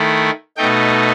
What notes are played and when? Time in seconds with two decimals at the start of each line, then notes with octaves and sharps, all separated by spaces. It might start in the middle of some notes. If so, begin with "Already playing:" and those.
Already playing: D#3 A3 E4
0.57 B2 A3 D#4 G5